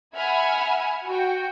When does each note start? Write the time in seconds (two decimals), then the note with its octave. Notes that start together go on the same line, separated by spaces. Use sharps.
0.16 E5 F#5 G#5 B5 F6 G#6
1.08 F#4 G5